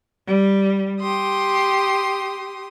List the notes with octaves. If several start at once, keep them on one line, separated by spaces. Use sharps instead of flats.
G3
G4 C6 D#6